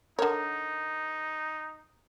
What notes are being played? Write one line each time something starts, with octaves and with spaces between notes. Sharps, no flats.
D3 D#4 A#4 C#5